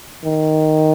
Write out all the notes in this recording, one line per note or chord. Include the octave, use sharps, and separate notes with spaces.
D#3